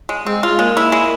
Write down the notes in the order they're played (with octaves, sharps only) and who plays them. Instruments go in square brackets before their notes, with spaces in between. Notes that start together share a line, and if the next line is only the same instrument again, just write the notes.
[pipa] G#3
[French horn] G#3 [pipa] C4
[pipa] F4
[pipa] G#3 [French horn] A#3
[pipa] E4
G#3